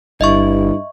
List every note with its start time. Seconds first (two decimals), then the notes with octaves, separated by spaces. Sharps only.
0.21 G1 G2 E4 D#5 E5 C#6